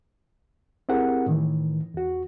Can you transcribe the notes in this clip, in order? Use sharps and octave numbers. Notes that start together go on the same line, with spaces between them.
C4 E4 G4 G#4 A#4 F#5
A2 D#3 E3
E2 F#4